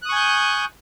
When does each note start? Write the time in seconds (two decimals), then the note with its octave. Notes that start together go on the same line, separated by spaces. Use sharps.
0.02 F#6
0.05 D#6
0.09 C#6
0.12 G#5
0.15 G6